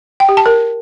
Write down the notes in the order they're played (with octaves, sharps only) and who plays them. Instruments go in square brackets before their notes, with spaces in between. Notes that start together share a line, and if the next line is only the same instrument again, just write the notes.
[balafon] G5
G4
A5
A#4